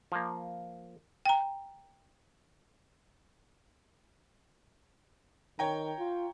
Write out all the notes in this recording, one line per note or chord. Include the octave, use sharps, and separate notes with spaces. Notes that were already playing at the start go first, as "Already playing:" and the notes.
F3 A#3
G5 A#5
D#3 C#5 G5 A#5
F4